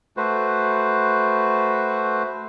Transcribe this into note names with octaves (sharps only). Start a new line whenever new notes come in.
A3 F#4 B4 C5